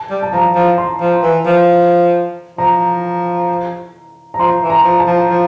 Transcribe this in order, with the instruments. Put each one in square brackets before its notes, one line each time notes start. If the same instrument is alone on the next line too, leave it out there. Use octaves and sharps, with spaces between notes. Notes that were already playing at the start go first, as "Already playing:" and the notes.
Already playing: [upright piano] A5
[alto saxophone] G3
[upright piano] A5
[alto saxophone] F3 [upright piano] A#5
[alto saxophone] F3
[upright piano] C6
[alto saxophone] F3
E3
F3
[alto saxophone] F3 [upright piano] A#5
[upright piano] A#5
[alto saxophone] F3 [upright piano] C6
[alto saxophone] E3
[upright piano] A#5
[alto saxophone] F3
[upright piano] A5
[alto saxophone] F3
F3